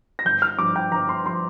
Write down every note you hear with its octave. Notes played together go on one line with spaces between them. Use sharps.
A#6
G1 G6
F6
G2 F3 D6
G5
G1 A#5
C6
F3 C6